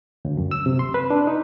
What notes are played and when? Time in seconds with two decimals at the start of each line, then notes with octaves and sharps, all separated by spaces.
0.25 D2
0.37 F#2
0.51 E6
0.66 C3
0.79 C6
0.94 B4
1.10 D4
1.27 D#4